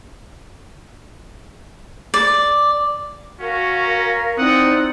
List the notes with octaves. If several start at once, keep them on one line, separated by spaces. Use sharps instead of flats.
D5
C#4 F#4 A#4 F5
C4 D#4 E4 D5 F#5 D#6